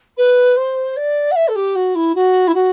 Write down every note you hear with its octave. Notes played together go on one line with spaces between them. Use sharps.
B4
C5
D5
F#5
E5
A4
G4
F#4
E4
F#4
E4
F#4